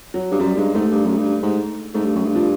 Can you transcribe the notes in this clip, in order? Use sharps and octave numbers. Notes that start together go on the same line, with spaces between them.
F#3
G2
F#2 G3
G2 G#3
G#2 A3
G2
F#2
G2
G#2
G#2 A3
G2
F#2
G2
F3